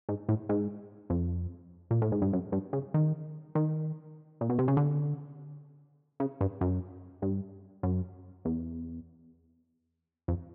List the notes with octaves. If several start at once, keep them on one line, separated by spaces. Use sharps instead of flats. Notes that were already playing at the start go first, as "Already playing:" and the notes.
G#2
A2
G#2
F2
A#2
A2
G#2
G2
F#2
G2
C#3
D#3
D#3
A#2
B2
C3
C#3
D3
C#3
G2
F#2
G2
F#2
E2
F2